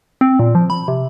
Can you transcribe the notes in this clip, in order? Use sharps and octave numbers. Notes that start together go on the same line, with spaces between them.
C4
A#2
F3
B5
C3